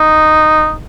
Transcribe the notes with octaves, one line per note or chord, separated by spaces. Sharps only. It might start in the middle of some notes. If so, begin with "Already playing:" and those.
Already playing: D#4